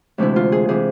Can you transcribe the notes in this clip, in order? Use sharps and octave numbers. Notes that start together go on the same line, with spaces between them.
D2 C3 E3 G#3 E4
F4
G#4
C3 E3 G#4